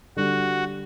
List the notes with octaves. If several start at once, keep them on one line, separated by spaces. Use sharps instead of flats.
D3 G3 D4 F#4